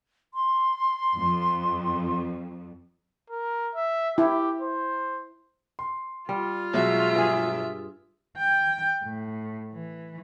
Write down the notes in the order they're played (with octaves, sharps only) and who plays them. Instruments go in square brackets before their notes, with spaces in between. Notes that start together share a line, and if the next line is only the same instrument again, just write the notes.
[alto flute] C6
[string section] F2
[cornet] A#4
E5
[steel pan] E4 [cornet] G4
[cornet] C5
[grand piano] C6
[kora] G3 [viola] F4
[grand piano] B2 F#3 G#3 [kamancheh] E5
[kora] G2 G#4
[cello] G5
A2
E3